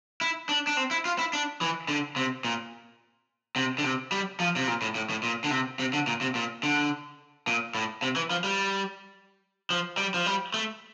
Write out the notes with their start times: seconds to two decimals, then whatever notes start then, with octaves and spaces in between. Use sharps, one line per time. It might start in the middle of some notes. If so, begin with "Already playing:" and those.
0.21 E4
0.49 D4
0.67 D4
0.77 C4
0.91 E4
1.05 F4
1.19 E4
1.33 D4
1.61 E3
1.88 D3
2.16 C3
2.45 A#2
3.56 C3
3.78 D3
3.84 C3
4.12 G3
4.40 F3
4.56 C3
4.68 A#2
4.82 A2
4.95 A2
5.10 A2
5.23 A#2
5.44 D3
5.51 C3
5.79 C3
5.93 D3
6.07 A#2
6.21 C3
6.35 A#2
6.63 D3
7.47 A#2
7.75 A2
8.02 C3
8.16 E3
8.30 F3
8.44 G3
9.70 F3
9.98 G3
10.14 F3
10.26 G3
10.54 A3